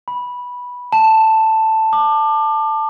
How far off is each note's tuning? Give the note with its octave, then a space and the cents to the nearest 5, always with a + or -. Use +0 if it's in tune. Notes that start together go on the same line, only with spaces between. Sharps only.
B5 -10
A5 +5
D6 +30